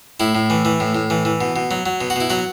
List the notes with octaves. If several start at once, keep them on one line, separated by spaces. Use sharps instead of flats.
A2 E4
A2
E3
E3
A2
A2
E3
E3
B2
B2
F#3
F#3
B2
F#4
B2 E4
F#3 F#4